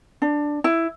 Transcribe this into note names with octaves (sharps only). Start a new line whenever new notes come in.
D4
E4